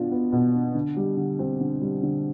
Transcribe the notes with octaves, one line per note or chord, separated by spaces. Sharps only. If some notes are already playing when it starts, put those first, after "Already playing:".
Already playing: B2 B3 D4 F4
B3
B2
D4
D3
G3
D3
C4
D3
G3
D3